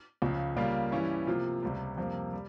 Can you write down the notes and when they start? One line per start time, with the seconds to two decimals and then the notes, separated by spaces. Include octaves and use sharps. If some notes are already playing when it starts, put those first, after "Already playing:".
0.22 C#2 C#3 F3
0.56 C#3 G3 A#3 F4
0.92 G2 E3 G3 C#4 E4
1.27 C3 F3 A#3 F4
1.63 C#2 C3 G3
1.98 F2 C3 G3 A#3
2.33 G3